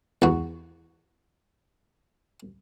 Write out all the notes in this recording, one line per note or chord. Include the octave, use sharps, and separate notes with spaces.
E2 F#4